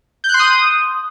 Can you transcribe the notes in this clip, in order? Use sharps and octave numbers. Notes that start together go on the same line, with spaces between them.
G6
F#6
C6
D#6